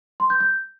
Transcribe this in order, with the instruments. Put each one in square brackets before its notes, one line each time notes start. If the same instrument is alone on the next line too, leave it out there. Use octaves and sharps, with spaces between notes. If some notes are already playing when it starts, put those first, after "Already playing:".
[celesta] C6
G6
G6